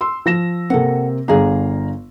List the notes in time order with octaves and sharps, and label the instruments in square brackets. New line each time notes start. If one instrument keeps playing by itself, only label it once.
[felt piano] C6 E6
F3 A#6 E7
[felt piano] C3 A#3 C4 [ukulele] A4 F#5
[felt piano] G1 F5 A#5 [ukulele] D4 G#4